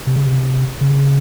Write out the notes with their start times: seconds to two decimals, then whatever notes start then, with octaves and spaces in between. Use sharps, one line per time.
0.07 C3
0.16 C#3
0.26 C3
0.81 C#3